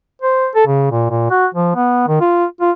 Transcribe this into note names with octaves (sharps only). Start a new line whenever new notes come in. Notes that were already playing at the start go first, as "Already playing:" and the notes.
C5
A4
C#3
A#2
A#2
F#4
F3
B3
D#3
F4
F4